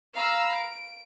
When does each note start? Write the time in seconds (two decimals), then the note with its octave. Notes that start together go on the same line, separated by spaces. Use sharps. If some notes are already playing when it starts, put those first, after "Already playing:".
0.14 F5 A#5 B5 E6
0.54 D7